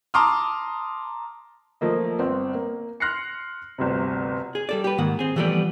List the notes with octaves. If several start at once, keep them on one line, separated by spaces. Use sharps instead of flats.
A5 A#5 C6 D6 D#6 F6
F3 A3 A#3 D#5
G1 C4
A#3
C6 F6 F#6 A#6 C7 C#7
G1 D2 C3
G#4
G3 A4 D5
G4 B4
G#2 D#3 A#3 F#5
C4 G#4
E3 F3 G3 A3 B3 D5